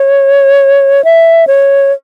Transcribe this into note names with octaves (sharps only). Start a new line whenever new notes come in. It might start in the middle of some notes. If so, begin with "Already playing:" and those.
Already playing: C#5
E5
C#5